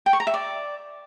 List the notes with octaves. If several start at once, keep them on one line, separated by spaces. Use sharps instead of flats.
G5
C#6
A#5
E5
D5